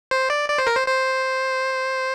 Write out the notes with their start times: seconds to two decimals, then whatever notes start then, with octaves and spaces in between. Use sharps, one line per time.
0.11 C5
0.30 D5
0.50 D5
0.58 C5
0.67 A#4
0.76 C5
0.88 C5